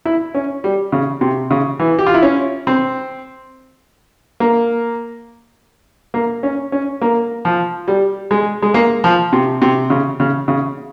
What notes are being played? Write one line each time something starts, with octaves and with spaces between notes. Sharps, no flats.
E4
C#4
G3
C#3
C3
C#3
E3
G4
F4
E4
C#4
C4
A#3
A#3
C#4
C#4
A#3
F3
G3
G#3
G#3
A#3
F3
C3
C3
C#3
C#3
C#3